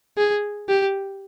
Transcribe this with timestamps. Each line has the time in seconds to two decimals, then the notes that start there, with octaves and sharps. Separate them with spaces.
0.17 G#4
0.68 G4